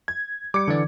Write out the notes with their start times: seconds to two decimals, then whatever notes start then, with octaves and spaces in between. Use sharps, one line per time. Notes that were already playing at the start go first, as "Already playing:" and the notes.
0.08 G#6
0.54 G3 D6 C#7
0.68 D3 E3 D5